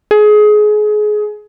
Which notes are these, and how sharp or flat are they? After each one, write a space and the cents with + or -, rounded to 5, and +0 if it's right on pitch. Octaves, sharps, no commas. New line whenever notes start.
G#4 +25